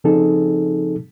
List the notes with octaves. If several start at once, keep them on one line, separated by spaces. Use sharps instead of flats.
C#3 F3 C4 D#4 G#4 A4